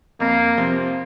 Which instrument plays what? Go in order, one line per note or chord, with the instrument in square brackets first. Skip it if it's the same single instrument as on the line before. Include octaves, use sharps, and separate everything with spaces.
[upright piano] F2 [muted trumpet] A#3
[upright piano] C3 F3 C4